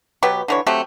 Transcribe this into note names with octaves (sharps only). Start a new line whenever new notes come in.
B2 F#3 B3 G4
D3 E3 C#5
F#3 A3 C4 G4